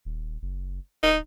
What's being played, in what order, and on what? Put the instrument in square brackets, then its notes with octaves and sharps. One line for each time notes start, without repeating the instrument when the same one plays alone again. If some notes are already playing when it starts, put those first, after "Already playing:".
[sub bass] D#1
F#1
[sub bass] D1 [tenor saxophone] D#4